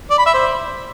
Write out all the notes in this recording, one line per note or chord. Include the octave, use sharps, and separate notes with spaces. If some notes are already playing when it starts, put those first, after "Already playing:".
D5
B5
E5
C5